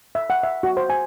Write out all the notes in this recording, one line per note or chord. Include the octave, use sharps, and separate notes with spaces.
E5
F#5
E5
F#4
C5
G#5